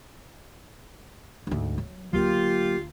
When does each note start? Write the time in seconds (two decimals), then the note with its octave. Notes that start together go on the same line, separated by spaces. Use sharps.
1.47 D2 G#2
1.78 F#3
2.13 D2 F#3 A#3 D4 F4 G4